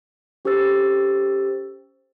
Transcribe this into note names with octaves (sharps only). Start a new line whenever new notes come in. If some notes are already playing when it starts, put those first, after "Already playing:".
C#4 G4 A4 C5 E6 A6